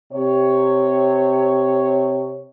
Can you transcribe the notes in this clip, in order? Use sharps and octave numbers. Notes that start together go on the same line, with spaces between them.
C3 C#5